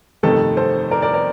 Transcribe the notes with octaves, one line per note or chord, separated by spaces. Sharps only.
G1 F2 C3 D#3 A3 A4
A4 C5
A#4 D5
A#4 D5
A#4 D5